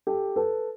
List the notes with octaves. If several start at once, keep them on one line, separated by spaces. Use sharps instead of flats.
G4 A4
A4 B4